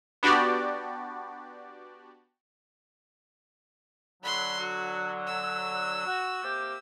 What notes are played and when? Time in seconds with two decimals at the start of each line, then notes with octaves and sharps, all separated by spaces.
0.23 B3 D4 F#4 G4 D5
4.23 D3 F#3 B5 C6
4.60 F#4
5.27 E6
6.06 F#4
6.43 C3 A#3 G4